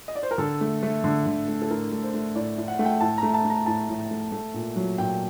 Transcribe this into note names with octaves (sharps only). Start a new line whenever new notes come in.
D#5
D5
C5
A#4
D3 A4
A3
A3
D3
D3
A3
A4
A2 A#4
A3
C5
A3
A2 D5
A2
F#5
A3 F#5
G5
A2 A5
A#5
A3
A5
A3
A#5
A2 A5
A2
A3
A3
A#2
F#3
A#2 G5